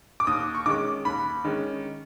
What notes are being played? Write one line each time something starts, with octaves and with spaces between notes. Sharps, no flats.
D6
D#2 D#6
C#6
D#3 G#3 C#4 D6
D#2 B5
D#3 G#3 C#4